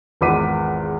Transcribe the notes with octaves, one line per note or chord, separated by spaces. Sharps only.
G#1 E2 F4 D6 B6 D#7